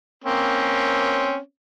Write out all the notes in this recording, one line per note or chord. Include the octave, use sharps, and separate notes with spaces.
A#3 C4 C#4